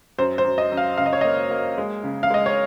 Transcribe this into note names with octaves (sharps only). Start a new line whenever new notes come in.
F#2 C5
C5
F#2
D#5
F#2
F5
C#3 F5
D#5
C#5
D#5
A#3
A#3
G#3
C#3
F5
G#3 D#5
C#5